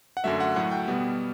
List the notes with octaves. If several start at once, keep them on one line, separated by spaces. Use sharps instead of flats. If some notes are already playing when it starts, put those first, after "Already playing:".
F#5
F#2 D3 F#3 A3 E5
F#5
A2 F#3 A3 F#5
G5
B2 G3 B3